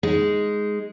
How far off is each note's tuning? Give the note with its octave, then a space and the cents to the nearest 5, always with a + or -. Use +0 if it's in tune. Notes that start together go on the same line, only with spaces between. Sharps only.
G#3 +0 D#4 +0